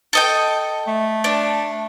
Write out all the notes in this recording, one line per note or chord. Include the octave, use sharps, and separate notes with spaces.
A4 D#5 G5
A3
D4